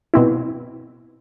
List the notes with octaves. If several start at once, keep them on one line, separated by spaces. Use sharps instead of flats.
B2 C4 E4